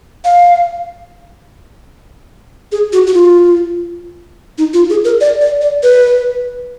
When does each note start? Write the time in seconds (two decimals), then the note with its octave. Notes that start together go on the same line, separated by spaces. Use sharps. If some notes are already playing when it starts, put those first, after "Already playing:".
0.25 F5
2.72 G#4
2.93 F#4
3.07 F#4
3.14 F4
4.58 D#4
4.74 F4
4.90 G#4
5.05 A#4
5.21 D5
5.41 D5
5.61 D5
5.83 B4